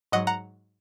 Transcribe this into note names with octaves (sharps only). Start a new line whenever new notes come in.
G#2 F#3 D#5 F#5
F#5 A#5